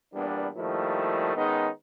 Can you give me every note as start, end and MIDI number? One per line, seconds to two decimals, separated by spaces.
0.14 0.48 40
0.14 0.48 46
0.14 0.48 55
0.14 0.48 59
0.14 0.48 62
0.56 1.36 46
0.56 1.36 51
0.56 1.36 53
0.56 1.36 55
0.56 1.36 57
0.56 1.36 64
1.36 1.69 51
1.36 1.69 56
1.36 1.69 59
1.36 1.69 61
1.36 1.69 63